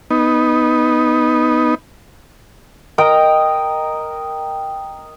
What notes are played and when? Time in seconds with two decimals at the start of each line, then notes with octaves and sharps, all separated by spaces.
0.11 B3 D#4
2.98 A#4 D#5 G5 A#5